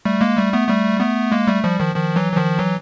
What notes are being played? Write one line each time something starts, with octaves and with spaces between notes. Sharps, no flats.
G3 A3
G#3 A#3
G3 A3
A3 B3
G3 A3
A3 B3
G#3 A#3
G3 A3
F3 G3
D#3 F3
D#3 F3
E3 F#3
E3
D#3 F3
E3 F#3